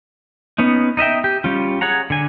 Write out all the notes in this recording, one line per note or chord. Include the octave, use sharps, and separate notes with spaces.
B3 C#4 D#4
D#4 D#5 E5 G5
G4
G3 C#4 F4
G#4 C#5 F#5 A#5
D3 G#5